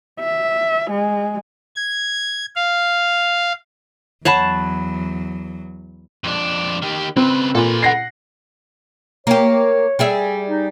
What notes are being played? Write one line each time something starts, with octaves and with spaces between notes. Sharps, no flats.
E5
G#3
G#6
F5
E2 F#3 C#5 F#5 A5 B5 C7
F2 D4
D#3 G4
C#3 C4 B4
A#2 A4 B4
F#5 A#6 C7
A#3 G4 C#5
G3 G#4 E5
D#4